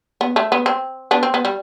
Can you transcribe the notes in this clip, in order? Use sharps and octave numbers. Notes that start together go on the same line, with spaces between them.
B3
A3
B3
C4
B3 D4
C4
B3
G3